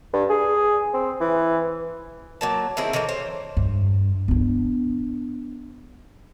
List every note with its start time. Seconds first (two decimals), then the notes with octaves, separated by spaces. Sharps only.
0.14 G2
0.30 G#4
0.94 C4
1.21 E3
2.41 F#3 A#3 A5
2.77 D#3 C4 E4 G#4
2.93 D#3 E3 A4 A#4
3.09 C5 C#5
3.57 G2
4.28 B3 D4